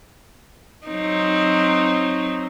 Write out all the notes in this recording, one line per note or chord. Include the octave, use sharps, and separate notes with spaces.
F#3 C4 D#4